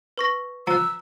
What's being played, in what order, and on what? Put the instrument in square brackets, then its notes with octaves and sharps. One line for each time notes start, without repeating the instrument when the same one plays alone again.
[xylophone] B4 C#6 A#6
[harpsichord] F3 [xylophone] A#5 F#6 [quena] E6